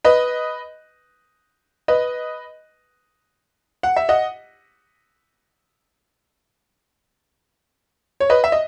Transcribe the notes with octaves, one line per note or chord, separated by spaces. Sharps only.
B4 D#5
B4 D#5
F#5
E5
D#5 F#5
C#5
B4 D#5
E5
D#5